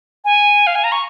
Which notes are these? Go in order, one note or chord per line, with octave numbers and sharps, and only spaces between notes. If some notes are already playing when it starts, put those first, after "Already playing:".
G#5
F5
G#5
A#5
C#6